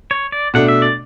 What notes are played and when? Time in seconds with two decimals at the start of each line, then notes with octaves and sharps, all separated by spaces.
0.11 C#5
0.32 D5
0.54 B2 A3 D4 F#5
0.68 E5
0.82 D5